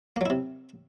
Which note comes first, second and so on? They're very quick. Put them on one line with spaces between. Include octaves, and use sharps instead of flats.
A#3 F#3 E4 C3